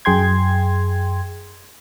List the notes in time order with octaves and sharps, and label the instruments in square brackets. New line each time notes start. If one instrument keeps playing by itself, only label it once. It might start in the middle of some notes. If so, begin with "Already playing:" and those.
[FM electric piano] F#2 G#4 G5 C6 G#6